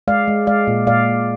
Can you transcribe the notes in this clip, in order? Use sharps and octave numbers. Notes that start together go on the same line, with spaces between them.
G#3 D5 F5
G#3
G#3 D5 F5
A#2
A#2 D5 F5